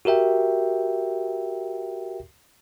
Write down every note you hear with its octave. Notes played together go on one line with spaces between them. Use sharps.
F#4 G4 A#4 E5 G5